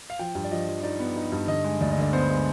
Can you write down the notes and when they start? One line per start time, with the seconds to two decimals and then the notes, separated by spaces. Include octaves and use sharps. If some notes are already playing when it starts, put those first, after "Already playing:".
0.10 F5
0.19 F3 G5
0.35 G2
0.44 D5
0.51 F3 D#5
0.67 F3
0.83 D#4 D5
1.00 B3
1.16 D#4
1.32 G2
1.48 D3 D#5
1.64 G#3
1.81 D2 D5
1.91 D#5
1.97 D3 D5
2.13 B3 C5
2.29 G#3